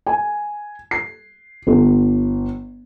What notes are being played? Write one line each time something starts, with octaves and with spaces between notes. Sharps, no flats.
G#5
C7
G1